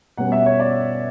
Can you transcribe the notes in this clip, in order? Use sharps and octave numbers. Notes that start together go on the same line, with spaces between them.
B2 G3 C#4 F#5
E5
C#5
D5